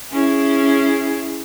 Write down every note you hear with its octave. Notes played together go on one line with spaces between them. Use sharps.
C#4 E4 G#4